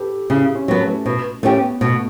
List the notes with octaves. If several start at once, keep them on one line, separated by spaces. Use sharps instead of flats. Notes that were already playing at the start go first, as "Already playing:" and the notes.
Already playing: G4 A4 B4
C#3 E4
C#4
F#3 B3
A3
B2
A3 C#4 G4
B3
B2 A3